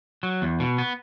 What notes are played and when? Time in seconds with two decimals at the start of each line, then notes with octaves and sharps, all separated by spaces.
0.23 F#3
0.42 E2
0.60 B2
0.78 B3